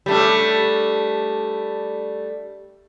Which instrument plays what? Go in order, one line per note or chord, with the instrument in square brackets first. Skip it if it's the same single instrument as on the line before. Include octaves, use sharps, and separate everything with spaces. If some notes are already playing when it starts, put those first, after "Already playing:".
[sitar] G3 A3 D4